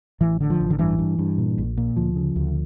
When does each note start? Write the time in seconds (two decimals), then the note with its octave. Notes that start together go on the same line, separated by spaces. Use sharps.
0.21 A1 E3
0.41 D3
0.50 F3
0.60 A1
0.70 D3
0.79 G2 E3
0.99 G2
1.19 G2
1.38 A#2
1.58 A#1
1.77 A#2
1.96 D2 F3
2.16 C#3
2.36 D2